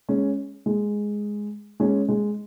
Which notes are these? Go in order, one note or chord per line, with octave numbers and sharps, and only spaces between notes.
G#3 C#4
G#3
G#3 C#4
G#3